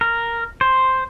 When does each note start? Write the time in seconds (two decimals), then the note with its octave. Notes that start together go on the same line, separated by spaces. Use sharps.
0.01 A#4
0.61 C5